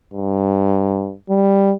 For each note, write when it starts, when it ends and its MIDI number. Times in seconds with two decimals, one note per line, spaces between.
0.13 1.13 43
1.29 1.73 55